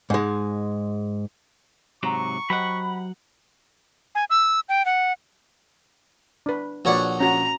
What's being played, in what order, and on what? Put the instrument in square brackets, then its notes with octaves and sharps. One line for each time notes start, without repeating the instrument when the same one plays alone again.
[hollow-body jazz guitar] G#2 G#3
[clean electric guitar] G#2 C3 F#3 [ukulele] F#5 A#5 [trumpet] C#6
[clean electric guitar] F#3 F#5 [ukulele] G4 C5 D#5 [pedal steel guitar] B5
[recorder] G#5
E6
G5
F#5
[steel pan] D4 B4
[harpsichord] A#1 C#5 F#5 [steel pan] F#4 B4 D5
[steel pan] C#4 F#4 [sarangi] A#5